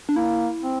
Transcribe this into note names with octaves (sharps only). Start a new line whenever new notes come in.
D4
A#3 E4
C4